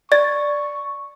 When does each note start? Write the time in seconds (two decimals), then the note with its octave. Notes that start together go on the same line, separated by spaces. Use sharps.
0.12 D5 C#6 A6